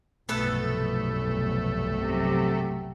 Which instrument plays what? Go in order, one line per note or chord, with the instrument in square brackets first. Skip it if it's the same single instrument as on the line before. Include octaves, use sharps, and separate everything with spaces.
[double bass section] F1 B1 G2 [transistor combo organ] A3 [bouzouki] B3 A4 B4
[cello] C3 F#3